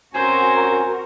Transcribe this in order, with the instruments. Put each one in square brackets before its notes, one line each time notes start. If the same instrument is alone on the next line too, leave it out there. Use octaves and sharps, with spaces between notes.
[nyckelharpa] C4 C5 [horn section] C#4 G#5 [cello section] F#4 A#4